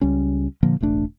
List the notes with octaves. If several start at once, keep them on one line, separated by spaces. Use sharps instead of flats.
C#2 G3 C#4
A#2 D3 F3 A#3
E1 A1 A3 D4